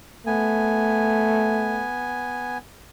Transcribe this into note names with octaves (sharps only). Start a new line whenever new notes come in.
A3 B3 G#5